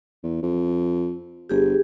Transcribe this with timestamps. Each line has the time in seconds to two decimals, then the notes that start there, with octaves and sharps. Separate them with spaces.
0.23 E2
0.42 F2
1.49 G1 G4 G#4